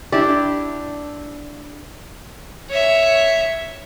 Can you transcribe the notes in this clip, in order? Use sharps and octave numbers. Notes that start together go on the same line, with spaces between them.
D4 E4 G4 D5
C#5 E5